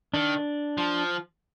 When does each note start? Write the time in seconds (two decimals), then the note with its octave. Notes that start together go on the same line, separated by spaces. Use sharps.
0.14 D#3 D4
0.78 F3